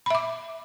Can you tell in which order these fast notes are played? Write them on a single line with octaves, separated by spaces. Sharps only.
B5 E5 D6